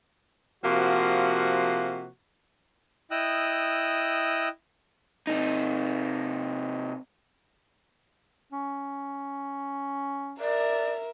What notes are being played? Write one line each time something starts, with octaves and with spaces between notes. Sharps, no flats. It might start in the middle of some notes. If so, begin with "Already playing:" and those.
C3 F3 A#3 F#4
E4 D#5 G5 D#6 E6 F#6
C3 D#4
C#4
A#4 D5 E5